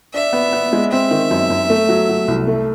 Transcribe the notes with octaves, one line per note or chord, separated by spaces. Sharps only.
D4 E5
B3
B3
G#3
C4 E5
D#3
F#2
F#2
A3
F#3
F#3
C2
A3